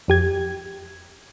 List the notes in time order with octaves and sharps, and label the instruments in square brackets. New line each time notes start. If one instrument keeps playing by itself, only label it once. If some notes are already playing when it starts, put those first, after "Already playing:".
[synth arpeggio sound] F2 G4 G#6